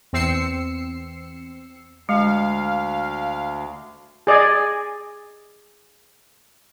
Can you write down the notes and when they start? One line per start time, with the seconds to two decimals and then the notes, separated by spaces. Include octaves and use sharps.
0.13 E2 C4 E6 C7 C#7
2.09 D2 G#3 F5
4.27 G#4 D5 D#5 G#5